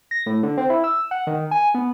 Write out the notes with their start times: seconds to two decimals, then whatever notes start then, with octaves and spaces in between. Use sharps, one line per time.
0.11 A#6
0.26 A2
0.43 D3
0.58 C4
0.70 E4
0.84 E6
1.11 F#5
1.27 D#3
1.51 G#5
1.75 B3